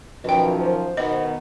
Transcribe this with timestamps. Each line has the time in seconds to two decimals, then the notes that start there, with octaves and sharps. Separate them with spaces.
0.24 F#2 B2 D#3 F3 D#5 G5
0.61 C5
0.97 B2 D#3 B3 D#5